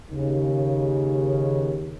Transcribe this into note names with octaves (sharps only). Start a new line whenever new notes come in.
D#2 C#3